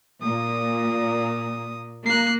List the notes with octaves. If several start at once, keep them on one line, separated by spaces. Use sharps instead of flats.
A#2 A#3 D#6
A#3 F#6 C7